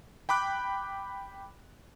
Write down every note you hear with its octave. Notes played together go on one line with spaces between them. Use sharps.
G5 B5 D6 F#6